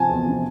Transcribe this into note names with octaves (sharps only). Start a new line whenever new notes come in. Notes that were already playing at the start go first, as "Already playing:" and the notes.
Already playing: C3 F3 G#5 A5
E2
C3 F3